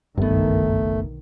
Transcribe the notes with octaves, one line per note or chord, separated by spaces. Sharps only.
F#1 B1 G2 D3 D#3 A3 B3